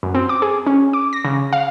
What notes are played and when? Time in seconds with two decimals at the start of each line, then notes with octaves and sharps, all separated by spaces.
0.03 F#2
0.15 C4
0.29 D6
0.42 G#4
0.67 C#4
0.93 D6
1.13 A#6
1.25 C#3
1.53 F5